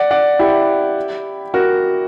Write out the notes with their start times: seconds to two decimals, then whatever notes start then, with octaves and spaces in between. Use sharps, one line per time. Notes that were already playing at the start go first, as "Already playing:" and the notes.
Already playing: D5 F#5
0.11 D5 F#5
0.39 E4 G4
1.54 F#4 A#4